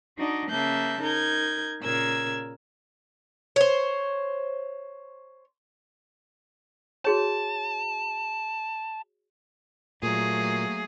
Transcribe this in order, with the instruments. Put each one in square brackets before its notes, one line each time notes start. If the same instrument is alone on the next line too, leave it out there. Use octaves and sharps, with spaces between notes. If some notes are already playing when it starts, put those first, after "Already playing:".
[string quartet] D4 D#4 F#4 D#5
C#3 A#3 E5 A5 F#6 G6
D#4 A#4 G6 G#6
A#2 C#3 A#4 E6 G#6
[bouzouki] C5 C#5
[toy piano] F#4 G#4 C#5 [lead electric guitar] A5
[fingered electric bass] A#2 [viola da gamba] F#3 A3 A#3 [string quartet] G#4